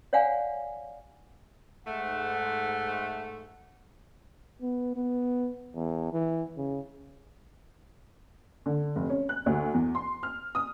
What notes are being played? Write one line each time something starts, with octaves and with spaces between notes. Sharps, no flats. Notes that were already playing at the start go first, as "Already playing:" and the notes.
C#5 D5 F5 F#5 G#5
G#2 A3 F#5
B3
B3
E2
E3
C#3
D3
F1
C#4
F#6
D2
E2
C6
F6
D#6